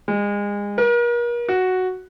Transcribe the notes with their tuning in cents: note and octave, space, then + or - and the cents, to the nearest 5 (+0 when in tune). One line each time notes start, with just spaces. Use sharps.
G#3 -30
A#4 +40
F#4 +0